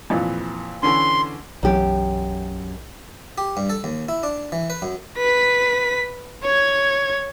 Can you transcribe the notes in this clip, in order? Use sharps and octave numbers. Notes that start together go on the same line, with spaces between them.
F2 A#2 E3
D3 E3 C#4 C6
B1 F#2 E3 F#3 G4
G4
G2
A4
D#2
E4
D4
E3
B4
F#2
B4 B6
C#5 G#6